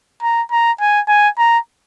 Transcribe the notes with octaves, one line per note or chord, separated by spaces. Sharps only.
A#5
A#5
G#5
G#5
A#5